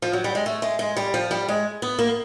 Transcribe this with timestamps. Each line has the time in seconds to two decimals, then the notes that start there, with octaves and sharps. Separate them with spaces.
0.02 F3
0.13 F#3
0.24 G3
0.35 G#3
0.46 A3
0.62 G#3
0.79 G#3
0.97 G3
1.14 F3
1.31 G3
1.48 G#3
1.82 B3
1.99 A#3